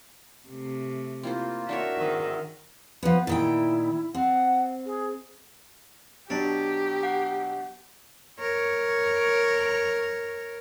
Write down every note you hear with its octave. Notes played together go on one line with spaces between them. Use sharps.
C3 A3
A#3 C4 E4 F4 C5
D4 F#4 A#4 C5 C#5 E5
G#2 D#3 C4 E5
F3 B3 B4
A#2 D#3 E4 G5
C4 F#5
G#4
B2 F#3 D4 G4
F#5
A#4 C#5